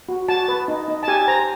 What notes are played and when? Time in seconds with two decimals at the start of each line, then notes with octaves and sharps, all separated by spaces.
0.09 F#4
0.28 F#4 A5
0.48 B4
0.68 D#4
0.88 D#4
1.03 A5
1.08 G4 G#5
1.28 C5 A#5